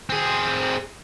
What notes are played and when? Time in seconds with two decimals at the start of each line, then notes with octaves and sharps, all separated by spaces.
0.10 C4 G#4